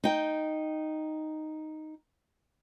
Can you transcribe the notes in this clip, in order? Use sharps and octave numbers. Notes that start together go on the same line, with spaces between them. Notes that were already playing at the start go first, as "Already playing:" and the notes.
D#4 G5